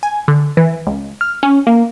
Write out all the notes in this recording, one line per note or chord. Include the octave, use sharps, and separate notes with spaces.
G#5
D3
E3
C#2
F6
C#4
A#3